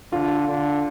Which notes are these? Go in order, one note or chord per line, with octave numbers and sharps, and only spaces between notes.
D3 F4
D3